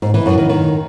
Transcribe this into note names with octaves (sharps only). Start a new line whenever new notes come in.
G#2
E3
F#2
D#3
D#3